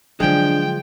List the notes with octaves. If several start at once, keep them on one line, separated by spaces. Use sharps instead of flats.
D3 F3 F#3 G#3 D4 G5